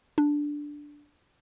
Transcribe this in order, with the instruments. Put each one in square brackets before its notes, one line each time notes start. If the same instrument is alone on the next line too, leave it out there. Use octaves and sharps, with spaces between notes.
[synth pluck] D4